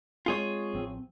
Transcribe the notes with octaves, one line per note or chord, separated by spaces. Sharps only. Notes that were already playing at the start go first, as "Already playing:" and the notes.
G#3 C4 F4 G#4 C#5
A1 F3 C4